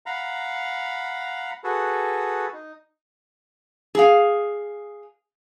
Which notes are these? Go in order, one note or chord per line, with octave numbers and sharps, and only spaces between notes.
F5 F#5 A#5 B5
F#4 G#4 A4 B4
D#4
G#4 F5